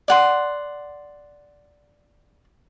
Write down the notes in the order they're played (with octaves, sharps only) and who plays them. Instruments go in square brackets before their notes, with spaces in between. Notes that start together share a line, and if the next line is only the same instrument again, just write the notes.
[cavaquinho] D5 F#5 C6